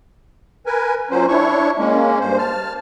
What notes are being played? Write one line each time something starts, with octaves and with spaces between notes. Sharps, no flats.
A#4 B4 G#5
A#2 F#3 C#4 C5
D4 E4 C#5 C#6
G#3 A#3 C#4
G2 C5
A5 F6